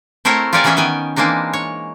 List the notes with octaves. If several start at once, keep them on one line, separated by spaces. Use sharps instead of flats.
A3 C4 E4 A#4 C5 C#5
F4 G4 A#4 C#5 D5 G#5
E3 B3 C#4 E4 G#4 E5
D#3 B3 G5 G#5
E3 G#3 A#3 C4 D4 D#4
C#5